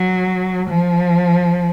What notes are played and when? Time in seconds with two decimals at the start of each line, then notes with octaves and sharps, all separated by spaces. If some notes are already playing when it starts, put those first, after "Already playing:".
Already playing: F#3
0.68 F3